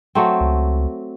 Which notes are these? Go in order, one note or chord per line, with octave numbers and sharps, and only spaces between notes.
F#3 A3 C4
C#2